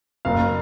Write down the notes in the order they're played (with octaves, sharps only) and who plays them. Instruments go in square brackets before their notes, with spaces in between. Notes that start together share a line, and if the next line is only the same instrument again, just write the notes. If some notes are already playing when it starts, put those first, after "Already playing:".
[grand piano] F#1 F5